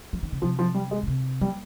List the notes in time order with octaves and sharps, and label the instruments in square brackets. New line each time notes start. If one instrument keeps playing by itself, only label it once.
[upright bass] F3
D#3
C#3
[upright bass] C3 [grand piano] F3
[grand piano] F3
G3
G#3
[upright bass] C#3
C3
[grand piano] G3 [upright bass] A#3